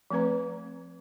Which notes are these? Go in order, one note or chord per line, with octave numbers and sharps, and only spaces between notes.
F3 A3 C4 B4 A#5